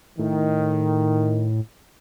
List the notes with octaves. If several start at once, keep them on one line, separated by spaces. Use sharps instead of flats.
A2 D#3